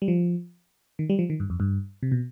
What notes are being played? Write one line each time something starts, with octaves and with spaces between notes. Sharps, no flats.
G3
F3
D#3
G3
F3
D#3
G2
F2
G2
C3
B2